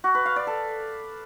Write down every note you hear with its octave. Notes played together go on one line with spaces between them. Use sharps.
F#4
B4
F5
D5
A4